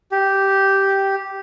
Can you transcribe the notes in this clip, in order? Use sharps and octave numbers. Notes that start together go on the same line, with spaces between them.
G4